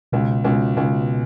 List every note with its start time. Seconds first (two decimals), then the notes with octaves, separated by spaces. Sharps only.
0.12 C#2 B2
0.44 C#2 B2
0.77 C#2